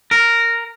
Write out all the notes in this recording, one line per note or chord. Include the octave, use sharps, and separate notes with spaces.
A#4